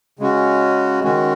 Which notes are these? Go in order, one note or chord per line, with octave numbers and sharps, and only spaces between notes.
C#3 G#3 C#4 F#4
D#3 G#3 C#4 F#4